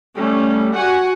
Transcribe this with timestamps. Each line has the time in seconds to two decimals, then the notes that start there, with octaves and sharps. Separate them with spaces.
0.17 G3 A3 C#4
0.72 F#4 F#5 G#5